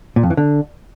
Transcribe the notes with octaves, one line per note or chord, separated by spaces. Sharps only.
A#2
F2
E3
D3